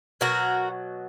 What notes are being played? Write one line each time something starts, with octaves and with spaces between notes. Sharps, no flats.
B2 F#3 F#4 A#4